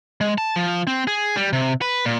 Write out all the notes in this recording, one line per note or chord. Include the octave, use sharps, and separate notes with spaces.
G#3
A5
F3
C4
G#4
G3
C3
B4
A#2